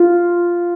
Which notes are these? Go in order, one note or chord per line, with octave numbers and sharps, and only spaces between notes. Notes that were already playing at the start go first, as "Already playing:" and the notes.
Already playing: F4